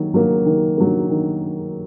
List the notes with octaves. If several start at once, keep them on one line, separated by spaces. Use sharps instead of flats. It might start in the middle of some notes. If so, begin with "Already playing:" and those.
Already playing: D#3 F#3 A#3
F#3 A#3
D#3
F#3 A#3
D#3